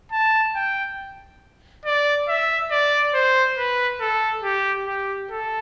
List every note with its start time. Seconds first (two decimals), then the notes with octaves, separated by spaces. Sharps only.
0.12 A5
0.56 G5
1.85 D5
2.28 E5
2.71 D5
3.14 C5
3.58 B4
4.01 A4
4.43 G4
4.87 G4
5.30 A4